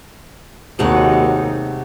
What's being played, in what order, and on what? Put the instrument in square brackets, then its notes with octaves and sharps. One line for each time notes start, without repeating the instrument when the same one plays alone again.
[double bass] D#2 D#4 [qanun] C3 G#3 F#5 [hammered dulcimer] F#3 A3